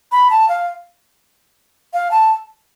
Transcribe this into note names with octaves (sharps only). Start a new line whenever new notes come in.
B5
A5
F5
F5
A5